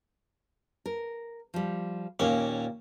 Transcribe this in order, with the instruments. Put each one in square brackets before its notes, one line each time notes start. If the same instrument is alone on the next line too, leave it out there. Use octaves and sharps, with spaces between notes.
[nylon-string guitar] A#4
F3 G3
[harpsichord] D#2 C#4 [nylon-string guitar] A#2 A#3